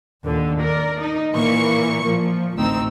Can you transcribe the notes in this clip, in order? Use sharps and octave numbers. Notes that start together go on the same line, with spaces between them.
D#2 A#2 D3
A#4 D5
D#4
A#2 E3 A#3 C#6 C#7
A#2 F3
A1 D2 A3 C4 D#4 E6